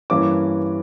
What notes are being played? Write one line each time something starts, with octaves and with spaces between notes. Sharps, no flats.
G2 E3 A#3 C#4 D6